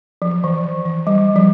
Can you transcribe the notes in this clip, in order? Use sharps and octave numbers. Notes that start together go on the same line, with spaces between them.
F3
E3
E3
G3
F3